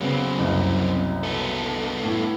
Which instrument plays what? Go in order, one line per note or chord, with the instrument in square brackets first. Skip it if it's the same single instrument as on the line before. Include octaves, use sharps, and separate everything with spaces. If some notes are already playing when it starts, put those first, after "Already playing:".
[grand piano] C#3 B3 [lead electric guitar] F#3 C4
[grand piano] F#1 C2 F#2
[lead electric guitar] B3 A4
[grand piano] A2 E4